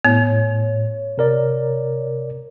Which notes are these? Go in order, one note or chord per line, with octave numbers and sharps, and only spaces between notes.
A2 B3 C#5
C3 A#4 D5